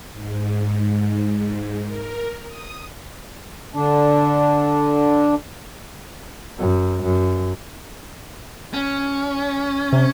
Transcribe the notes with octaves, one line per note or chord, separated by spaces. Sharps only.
G#2
A#4
D#6
D3 D4
F#2
F#2
C#4
C3